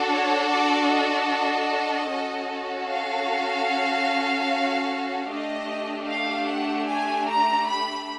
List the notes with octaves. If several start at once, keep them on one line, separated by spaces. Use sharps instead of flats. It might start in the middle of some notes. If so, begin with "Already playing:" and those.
Already playing: D4 F#4 A4
C#5
D5
D#5
C#4 F#4 A4
F5
A3 D4 G4 D#5
F5
F#5
G#5
A#5
B5